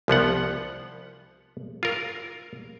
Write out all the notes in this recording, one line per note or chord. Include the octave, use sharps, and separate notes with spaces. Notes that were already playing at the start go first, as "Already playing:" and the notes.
C2 F3 B3 F#5
F4 A#4